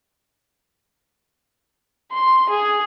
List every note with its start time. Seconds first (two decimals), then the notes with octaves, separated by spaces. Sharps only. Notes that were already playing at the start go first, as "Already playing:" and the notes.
2.12 C6
2.50 G#4